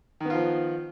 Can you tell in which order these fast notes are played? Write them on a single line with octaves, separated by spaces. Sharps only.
D#3 B3 F4 F3